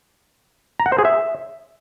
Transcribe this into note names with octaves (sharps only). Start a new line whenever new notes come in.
A#5
F#5
C5
G#4
E5